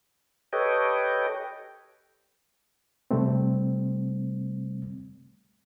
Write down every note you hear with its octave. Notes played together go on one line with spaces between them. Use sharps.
G4 A4 B4 C#5 D#5 G5
C3 G3 A3 C4